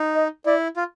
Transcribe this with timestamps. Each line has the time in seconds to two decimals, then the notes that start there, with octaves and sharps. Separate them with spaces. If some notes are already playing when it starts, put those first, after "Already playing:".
Already playing: D#4
0.15 D#5
0.46 E4 D5
0.76 F4